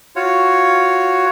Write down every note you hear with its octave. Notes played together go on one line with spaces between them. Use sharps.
F4 F#4 C#5